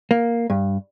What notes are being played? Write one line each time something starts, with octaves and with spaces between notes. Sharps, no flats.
A#3
G2